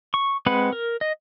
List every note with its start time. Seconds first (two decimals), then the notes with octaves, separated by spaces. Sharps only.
0.14 C#6
0.46 G#3 C4 B4 F#5 B5
0.73 A#4
1.01 D#5